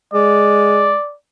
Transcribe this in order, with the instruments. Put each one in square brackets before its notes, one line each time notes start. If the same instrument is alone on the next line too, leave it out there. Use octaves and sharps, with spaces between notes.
[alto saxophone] G#3 [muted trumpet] D5